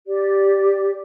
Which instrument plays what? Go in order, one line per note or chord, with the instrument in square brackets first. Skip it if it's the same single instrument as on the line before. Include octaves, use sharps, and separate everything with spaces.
[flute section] G4 D5